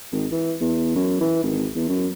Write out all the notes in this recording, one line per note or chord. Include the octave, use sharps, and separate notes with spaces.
G#1
E3
E2
F#2
E3
G#1
E2
F#2